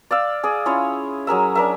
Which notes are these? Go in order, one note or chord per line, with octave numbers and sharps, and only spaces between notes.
D5 F5 E6
G#4 D5
C#4 E4 F4 C#5
F#3 G#4 A#4 E5
D4 A#4 E5